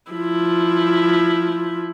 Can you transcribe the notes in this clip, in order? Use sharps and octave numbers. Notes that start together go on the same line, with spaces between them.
F3 E4